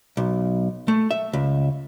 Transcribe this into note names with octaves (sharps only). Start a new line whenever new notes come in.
B1
A3
E5
C#2